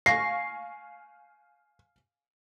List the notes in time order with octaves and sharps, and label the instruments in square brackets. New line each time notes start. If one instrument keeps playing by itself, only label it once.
[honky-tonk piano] F5 G#5 C#6 [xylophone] A#6 [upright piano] C7